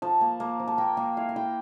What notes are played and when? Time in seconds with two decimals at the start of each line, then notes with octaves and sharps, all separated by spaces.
0.02 F3 A5
0.21 A#3
0.40 A#3
0.60 F3
0.68 A5
0.78 A#3 G5
0.97 A#3 F5
1.17 E4 F5
1.29 F5
1.36 E4 G5